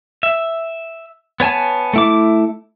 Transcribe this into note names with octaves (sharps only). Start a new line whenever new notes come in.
E5
B3 C#5 G#5 A5
A3 E4 D6